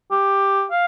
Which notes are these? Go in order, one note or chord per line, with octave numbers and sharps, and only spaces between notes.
G4
F5